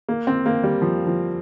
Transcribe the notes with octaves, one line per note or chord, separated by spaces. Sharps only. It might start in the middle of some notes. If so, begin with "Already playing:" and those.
A#3
C4
A#3
G3
F3
F3